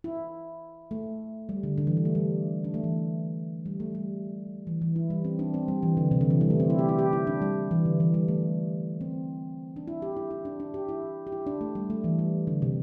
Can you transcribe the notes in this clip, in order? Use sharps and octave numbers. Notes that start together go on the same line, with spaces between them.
E4
A3
G3
D3
D3
E3
G3
A3
G3
D4
A3
E3
G3
A3
G3
E3
E3
E4
G3
C4
D4
C4
G3
E3
D3
C3
D3
E3
G3
A3
C4
E4
G4
E4
G4
E4
D4
G3
E3
D3
E3
G3
A3
C4
D4
E4
G4
E4
E4
D4
D4
G4
E4
G4
E4
D4
A3
G3
A3
E3
G3
D3
C3